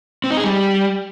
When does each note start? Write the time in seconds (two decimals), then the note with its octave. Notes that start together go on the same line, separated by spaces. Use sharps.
0.24 C4
0.30 D#4
0.37 G#4
0.44 G3